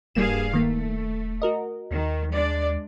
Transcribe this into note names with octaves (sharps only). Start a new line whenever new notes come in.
D#1 G2 G3 A#3 G#4 F5 E7
D#3 A3 A#3
F#4 A#4 D#5
D#2 D#3
G#3 D4 D5